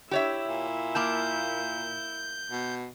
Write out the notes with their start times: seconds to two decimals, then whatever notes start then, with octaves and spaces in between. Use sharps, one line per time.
0.11 E4 G4 C#5 E5
0.48 A#2
0.95 A#3 A#4 A5 G6
2.51 B2